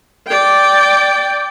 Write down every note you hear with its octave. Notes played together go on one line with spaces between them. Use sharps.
D5 G5